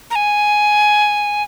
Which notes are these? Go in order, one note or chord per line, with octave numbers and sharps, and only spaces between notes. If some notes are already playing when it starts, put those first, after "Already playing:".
A#5
G#5